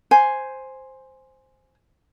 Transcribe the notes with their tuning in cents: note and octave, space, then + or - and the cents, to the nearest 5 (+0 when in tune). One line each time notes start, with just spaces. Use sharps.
C5 +0 G#5 +0